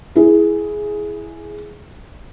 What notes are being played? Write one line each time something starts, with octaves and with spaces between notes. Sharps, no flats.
E4 G#4